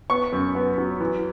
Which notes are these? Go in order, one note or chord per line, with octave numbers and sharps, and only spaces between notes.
B3 C#6
F#2
B3
F#3
E3